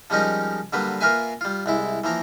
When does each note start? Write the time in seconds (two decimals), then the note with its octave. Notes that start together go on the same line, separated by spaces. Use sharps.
0.10 F3 G3 G#3 C#4 D#4 A#4
0.73 D3 F#3 G3 A#3 B4
1.01 A#3 F4 A#4 B4 E5 G#5
1.41 G3 F4
1.66 C2 G#3 E4
2.04 E3 F3 A#3 A#4